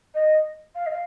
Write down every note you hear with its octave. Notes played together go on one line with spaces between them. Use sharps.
D#5
F5
D#5
F5